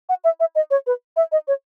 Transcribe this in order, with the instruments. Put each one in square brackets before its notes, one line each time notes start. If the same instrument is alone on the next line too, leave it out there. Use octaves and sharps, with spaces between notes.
[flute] F#5
E5
E5
D#5
C#5
B4
E5
D#5
C#5